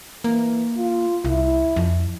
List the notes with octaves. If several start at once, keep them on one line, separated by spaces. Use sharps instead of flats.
E3 A#3
F4
C2 E4
F2